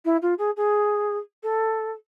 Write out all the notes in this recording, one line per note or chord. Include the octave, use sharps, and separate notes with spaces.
E4
F4
G#4
G#4
A4